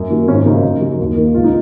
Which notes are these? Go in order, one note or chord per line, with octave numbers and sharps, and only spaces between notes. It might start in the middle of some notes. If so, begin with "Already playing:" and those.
Already playing: F#2
D#3 F#3 A#3
G#1 C#4
F#2 C#3 F#3 D#4
F#2
C#3 F#3
D#2
D#3 A#3
C#2 F4
D#4